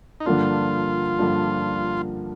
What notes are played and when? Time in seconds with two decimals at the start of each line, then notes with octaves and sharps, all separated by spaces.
0.20 D#4
0.26 G2 D3 F3 A#3 D4 F4
1.18 G2 D3 F3 A#3 D4